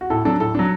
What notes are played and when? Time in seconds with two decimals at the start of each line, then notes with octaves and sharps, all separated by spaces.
0.01 F#4
0.10 A2 A4
0.25 F#3 D4 A4
0.40 A2 A4
0.55 F#3 D4